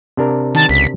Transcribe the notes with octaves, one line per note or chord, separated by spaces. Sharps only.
C3 D4 A#4
D#3 A5
C#2 B6